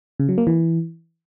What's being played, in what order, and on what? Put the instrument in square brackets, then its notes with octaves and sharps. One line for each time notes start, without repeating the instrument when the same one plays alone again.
[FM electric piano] C#3
F#3
A#3
E3